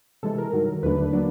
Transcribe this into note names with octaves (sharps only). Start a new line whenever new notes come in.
C3 E3 G#3 A4
A#4
G2 D#3 F#3
D#2 D3 F#3 A3 D4 B4
F#3 A#3 D4